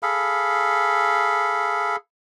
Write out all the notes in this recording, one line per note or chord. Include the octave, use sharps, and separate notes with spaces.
G#4 A4 F5 B5